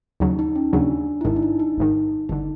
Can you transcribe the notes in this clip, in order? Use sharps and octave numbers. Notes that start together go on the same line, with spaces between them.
D#2 C#3 F#3 D#4
D#4
C#4
D#2 C#3 F#3 D4
E4
G#1 G#2 D#3 D#4
D4
D#4
D#4
G#1 G#2 D#3
G1 D3 D#4